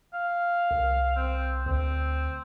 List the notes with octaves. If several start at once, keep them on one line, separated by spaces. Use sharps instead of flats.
F5
C2
C4
D2 C4